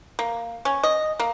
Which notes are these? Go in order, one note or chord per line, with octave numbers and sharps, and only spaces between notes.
A#3
C#4
D#5
A#3